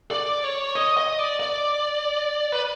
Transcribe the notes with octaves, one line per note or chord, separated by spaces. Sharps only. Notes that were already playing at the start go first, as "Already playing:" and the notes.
D5
C#5
D#5
D#5
D5
D5
B4